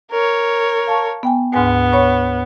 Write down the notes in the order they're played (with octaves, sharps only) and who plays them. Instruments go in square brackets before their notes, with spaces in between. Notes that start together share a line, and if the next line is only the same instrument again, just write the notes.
[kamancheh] A#4 C#5
[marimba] F5 A5 C#6
B3 G5 G#5
[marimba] D2 G#2 G#5 [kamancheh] B3
[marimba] C#5 B5 C#6